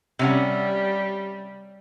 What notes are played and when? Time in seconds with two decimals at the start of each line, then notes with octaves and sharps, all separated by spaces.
0.19 C3 G3 C#4 F#5